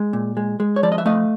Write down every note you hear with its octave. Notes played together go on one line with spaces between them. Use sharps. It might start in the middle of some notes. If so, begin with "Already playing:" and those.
Already playing: G#3
A#2
G#3
G#3
C#5
F3 D5
D#5
E5
A3 D#5 F5